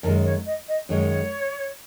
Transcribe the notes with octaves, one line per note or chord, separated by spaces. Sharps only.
F#2 D#3 G#3 A#4
C#5
D#5
D#5
F#2 D#3 G#3 C#5